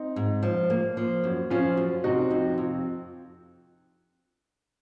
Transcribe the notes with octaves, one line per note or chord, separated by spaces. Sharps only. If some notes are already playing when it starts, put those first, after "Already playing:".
Already playing: C4 D#4
G#2
F3
A#3
F3
F#2
F3 C#4 F4
F#2
C3 D#4 F#4
F2
F2